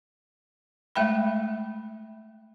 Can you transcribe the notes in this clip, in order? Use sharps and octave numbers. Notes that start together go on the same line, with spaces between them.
G#3 A3 E5 G5 B5